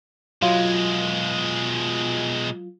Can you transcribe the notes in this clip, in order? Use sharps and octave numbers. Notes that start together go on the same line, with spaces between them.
B2 F#3 G#3 F4